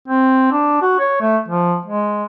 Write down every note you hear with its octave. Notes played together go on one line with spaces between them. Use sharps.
C4
D4
F#4
C#5
A3
F3
G#3